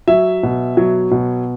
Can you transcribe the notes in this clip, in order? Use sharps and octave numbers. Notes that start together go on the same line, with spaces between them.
F#3 E5
B2
F#3
B2